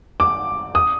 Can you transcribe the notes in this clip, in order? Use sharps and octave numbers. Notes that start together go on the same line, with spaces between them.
D6
D#6